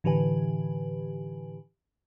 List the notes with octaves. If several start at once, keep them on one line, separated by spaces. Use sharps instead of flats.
A2 D3 E3 G4 B4 G#5